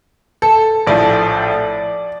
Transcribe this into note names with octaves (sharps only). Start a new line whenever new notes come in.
A4
A#1 A2 F3 D5